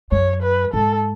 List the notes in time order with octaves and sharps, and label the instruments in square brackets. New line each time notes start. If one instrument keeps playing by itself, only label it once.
[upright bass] F#2 [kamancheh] C#5
[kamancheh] B4
[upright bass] G#2 [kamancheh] A4